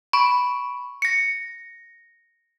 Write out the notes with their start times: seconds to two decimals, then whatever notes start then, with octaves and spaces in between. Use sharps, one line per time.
0.13 B5 C#6 D7
1.02 A#6 C#7